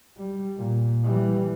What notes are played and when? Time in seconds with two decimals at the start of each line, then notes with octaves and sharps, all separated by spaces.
0.17 G3
0.57 A#2
1.04 E3 G3